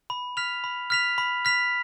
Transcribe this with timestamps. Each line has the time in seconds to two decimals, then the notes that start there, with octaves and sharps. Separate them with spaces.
0.10 B5
0.37 F6 B6 F7
0.64 B5
0.90 F6 B6 F7
1.18 B5
1.45 F6 B6 F7